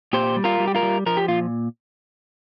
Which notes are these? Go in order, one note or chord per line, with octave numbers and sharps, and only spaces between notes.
A#2 G4 C5
G3
F4 A#4
G3
G4
F4 A#4
G3
F3 A#4
G4
A#2 F4